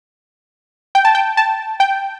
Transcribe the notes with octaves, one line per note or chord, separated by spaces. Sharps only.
G5
A5
G5
A5
G5